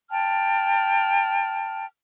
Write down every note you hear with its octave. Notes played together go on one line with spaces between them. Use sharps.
G5 A5 F6